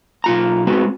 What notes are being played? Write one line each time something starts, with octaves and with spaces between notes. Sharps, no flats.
B1 F4 A#5
G#3 B3 C4 F#4